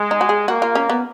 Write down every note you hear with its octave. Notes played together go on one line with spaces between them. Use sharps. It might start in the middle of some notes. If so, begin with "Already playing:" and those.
Already playing: G#3
D#4
F#4
G#4
A#3 F#4
F4
C#4
B3